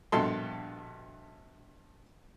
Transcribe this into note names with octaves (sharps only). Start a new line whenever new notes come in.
A#1 G2 B2 A4 C6